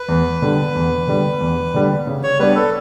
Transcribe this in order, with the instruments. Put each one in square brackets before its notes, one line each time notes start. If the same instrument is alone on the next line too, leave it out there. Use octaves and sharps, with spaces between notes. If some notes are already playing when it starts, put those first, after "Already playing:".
Already playing: [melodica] B4
[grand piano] E2
D3 G3
E2
D3 G3
E2
D3 G3
C#3
[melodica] C#5
[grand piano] G3 B3 D4 [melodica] B4
[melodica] A4